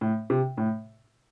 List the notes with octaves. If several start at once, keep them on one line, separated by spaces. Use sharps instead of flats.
A2
C3
A2